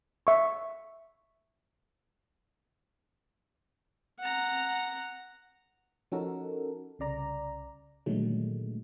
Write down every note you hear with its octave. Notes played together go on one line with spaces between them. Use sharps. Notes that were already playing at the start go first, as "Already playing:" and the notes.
E5 C#6
F#5 A#5
F3 C#4 D#4 F#4 A4 A#4
C2 C#3 D5 A#5
A#2 D3 D#3 F#3 G#3 A3